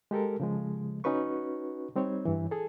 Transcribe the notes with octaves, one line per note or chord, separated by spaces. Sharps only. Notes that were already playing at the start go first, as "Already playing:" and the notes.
G#3 G4 A4 A#4
C#3 F3 G#3
C#4 D#4 F#4 B4 C#6
G3 C4 D#4 C#5
G2 E3
G#4 A4